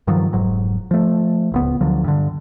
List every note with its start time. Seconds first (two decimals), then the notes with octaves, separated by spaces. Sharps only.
0.07 G2 D#3 F3 F#3
0.33 F1 G#2 F#3
0.91 F3 A3
1.52 D1 C#2 B3
1.81 D2 D3 F3 F#3
2.04 G2 D3